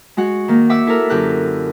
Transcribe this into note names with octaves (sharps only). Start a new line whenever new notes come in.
G#3 F#4 F#5
D#3 A#3
E5 F#5 D6 E6
E4 A4 A#4
F#2 D3 E4 G4 F#6